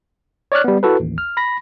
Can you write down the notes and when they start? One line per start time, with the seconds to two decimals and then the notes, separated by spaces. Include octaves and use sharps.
0.52 C#5 D5 D6 F6 F#6
0.64 G3 B3
0.83 E4 F#4 A4 B4
1.00 A1 D#2
1.18 F6
1.37 B5 A#6